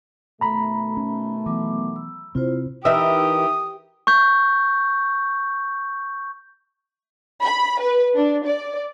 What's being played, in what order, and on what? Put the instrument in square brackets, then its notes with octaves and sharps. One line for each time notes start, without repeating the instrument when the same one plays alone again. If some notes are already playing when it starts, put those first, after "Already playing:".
[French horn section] B2 D#3 A3 [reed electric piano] A#5 B5
[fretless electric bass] C#4
[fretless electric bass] E3 [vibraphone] F#3 B3 D6
[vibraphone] E6
[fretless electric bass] C3 C4 [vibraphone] E4 F4 C5
[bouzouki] E3 A#4 [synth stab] D#4 E5 E6 [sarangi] G4 [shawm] D#6
[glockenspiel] C#6 G6
[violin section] B5
B4
D4
D5